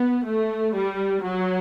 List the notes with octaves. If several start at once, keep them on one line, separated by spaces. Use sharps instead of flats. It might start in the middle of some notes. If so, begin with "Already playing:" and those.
Already playing: B3
A3
G3
F#3